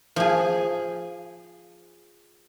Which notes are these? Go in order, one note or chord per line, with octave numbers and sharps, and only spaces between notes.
F3 G#4